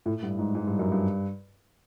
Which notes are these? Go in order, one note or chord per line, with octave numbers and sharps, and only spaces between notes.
A2
G2
G#2
G#2
G2
F#2
G2